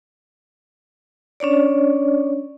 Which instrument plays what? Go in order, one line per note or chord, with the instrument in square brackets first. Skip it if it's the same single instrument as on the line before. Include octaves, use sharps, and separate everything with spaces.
[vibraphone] C#4 D4 C#5 D5